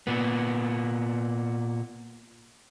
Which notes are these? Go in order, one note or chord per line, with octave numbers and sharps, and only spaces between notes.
A#2 B3